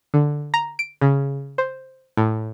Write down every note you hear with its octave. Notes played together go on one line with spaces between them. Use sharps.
D3
A#5
D7
C#3
C5
A2